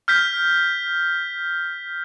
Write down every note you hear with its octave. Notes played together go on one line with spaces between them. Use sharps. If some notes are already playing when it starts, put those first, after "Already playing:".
F6 G6 B6